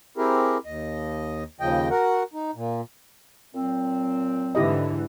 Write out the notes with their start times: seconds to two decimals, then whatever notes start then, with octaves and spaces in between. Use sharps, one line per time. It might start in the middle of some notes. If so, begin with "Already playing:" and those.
0.17 C4 E4 G4 G#4 A#4
0.66 D#2 D#5
1.60 D#2 C#3 F3 D#5 G5
1.90 F#4 A#4 F#5
2.34 D#4
2.55 A#2
3.54 A#2 F#3 C4
4.55 G#2 D3 E3 E4 G4 D#5